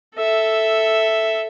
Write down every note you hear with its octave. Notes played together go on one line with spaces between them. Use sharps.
A4 E5